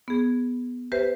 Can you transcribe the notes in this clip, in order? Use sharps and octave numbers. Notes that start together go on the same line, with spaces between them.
B3 G#4
G4 B4 C5 E5